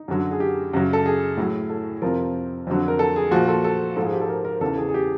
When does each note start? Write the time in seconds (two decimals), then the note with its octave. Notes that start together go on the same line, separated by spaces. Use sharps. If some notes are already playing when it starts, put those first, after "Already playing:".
Already playing: D#4
0.08 F#2 D3 F#3
0.31 G#4
0.40 G4
0.73 F#2 C#3 F#3
0.93 A4
1.06 G#4
1.37 A2 F#3
1.70 A4
2.02 F2 C3 F3 A#4
2.67 F2 D3 F#3
2.88 A#4
2.99 A4
3.16 G#4
3.31 A#2 F3 F#4
3.48 A4
3.64 A4
3.96 G#2 F3 A4
4.05 G#4
4.12 G4
4.21 A4
4.29 A#4
4.45 A#4
4.61 E2 C#3 E3 A4
4.77 G#4
4.89 G#4
4.94 G4